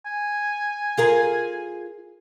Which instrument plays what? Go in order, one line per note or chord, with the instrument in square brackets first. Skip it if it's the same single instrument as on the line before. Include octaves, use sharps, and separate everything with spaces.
[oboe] G#5
[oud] F4 G#4 A#4